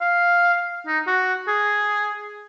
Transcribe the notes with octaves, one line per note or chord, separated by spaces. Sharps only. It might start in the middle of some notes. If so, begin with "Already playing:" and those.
F5
D#4
F#4
G#4